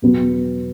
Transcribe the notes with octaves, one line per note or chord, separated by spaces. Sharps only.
E2 B2 F#3 B3 F#4